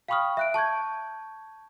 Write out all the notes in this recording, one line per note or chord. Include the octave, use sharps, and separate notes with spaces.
F5 G5 B5 C#6 D#6 F6
E5 F#6 D7
A5 C#6 G6 G#6